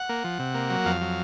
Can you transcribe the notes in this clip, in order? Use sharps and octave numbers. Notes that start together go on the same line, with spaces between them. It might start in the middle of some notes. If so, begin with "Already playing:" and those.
Already playing: F#5
A#3
F3
C3
A#3
F#3
F2 F5
F#3